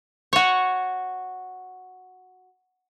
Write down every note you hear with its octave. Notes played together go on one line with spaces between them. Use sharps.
F#4 C#5